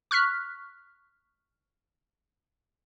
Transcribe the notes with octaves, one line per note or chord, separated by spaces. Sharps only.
C#6 F6 F#6 B6